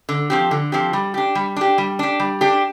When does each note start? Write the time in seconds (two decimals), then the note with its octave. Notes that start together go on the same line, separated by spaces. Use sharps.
0.09 D3
0.30 F3 C4 G4
0.51 D3
0.72 F3 C4 G4
0.93 G3
1.14 D4 G4
1.35 G3
1.56 D4 G4
1.78 G3
1.99 D4 G4
2.20 G3
2.41 D4 G4